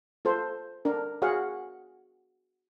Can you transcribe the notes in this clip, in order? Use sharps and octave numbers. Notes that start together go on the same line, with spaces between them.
F4 A4 C5
D4 A#4
F#4 G#4 C#5 F5 F#5